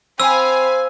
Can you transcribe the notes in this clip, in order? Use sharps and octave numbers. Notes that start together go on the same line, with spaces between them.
C4 F5 G#5 B5 E6